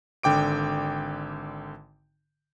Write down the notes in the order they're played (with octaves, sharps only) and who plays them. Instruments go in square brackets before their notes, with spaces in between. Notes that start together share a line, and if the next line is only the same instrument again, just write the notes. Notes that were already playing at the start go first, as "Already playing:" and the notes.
[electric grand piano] G#1 D3 G5 D6 D7